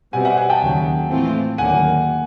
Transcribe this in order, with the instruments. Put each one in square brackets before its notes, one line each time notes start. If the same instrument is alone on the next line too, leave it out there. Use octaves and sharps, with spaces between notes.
[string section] B2 G3 C4 [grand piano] F#5 G#5
[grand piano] E5 F#5
F#5 G#5
G5 A5
[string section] D#2 C#3 F#3
A2 E3 A3 C4 F4
[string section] D#2 D3 F#3 A#3 [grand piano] F#5 G#5